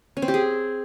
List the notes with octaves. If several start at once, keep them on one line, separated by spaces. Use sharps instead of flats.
C#4
C4
G4
G#4